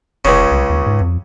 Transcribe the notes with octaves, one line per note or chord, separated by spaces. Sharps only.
F1 C#2 C#3
C2
D#2
G#2
F2